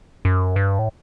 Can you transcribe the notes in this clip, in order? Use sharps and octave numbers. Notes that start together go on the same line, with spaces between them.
F#2
G2
A2